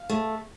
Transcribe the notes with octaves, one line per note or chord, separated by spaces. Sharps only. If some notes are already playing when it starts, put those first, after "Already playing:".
Already playing: F5
A3